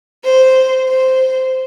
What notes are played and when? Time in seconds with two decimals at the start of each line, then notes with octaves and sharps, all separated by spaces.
0.24 C5
0.89 C5